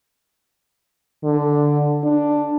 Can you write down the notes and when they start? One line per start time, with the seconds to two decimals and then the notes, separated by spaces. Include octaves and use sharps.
1.24 D3
2.04 D4